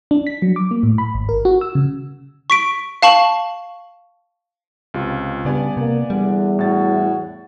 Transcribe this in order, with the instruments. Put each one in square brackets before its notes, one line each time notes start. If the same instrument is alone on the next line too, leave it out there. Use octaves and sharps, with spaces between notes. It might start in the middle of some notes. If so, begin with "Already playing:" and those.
[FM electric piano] D4
B6
F#3
D6
A#3
A2
B5
G#1
A#4
F#4
E6
C#3
[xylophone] C#6 B6 D7
F5 A5 C#6 F#7
[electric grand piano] C#2 C3 F4
[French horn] G2 [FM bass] C#3 [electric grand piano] B3 D5 G#5
[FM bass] C3 [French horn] A#3
[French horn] E2 [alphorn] D3 [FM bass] G3
[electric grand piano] A2 A6 [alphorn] F#4